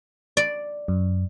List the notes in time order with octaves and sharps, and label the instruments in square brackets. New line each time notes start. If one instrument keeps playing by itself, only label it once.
[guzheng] D5
[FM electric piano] F#2